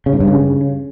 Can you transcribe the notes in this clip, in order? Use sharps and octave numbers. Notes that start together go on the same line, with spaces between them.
C#3
G#2
G2
C#3